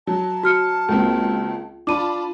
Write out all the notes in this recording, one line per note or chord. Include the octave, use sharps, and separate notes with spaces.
F#3 A5
F#4 F6 C#7
C#2 A#3 C4
D4 F4 A5 B5 D6 D#7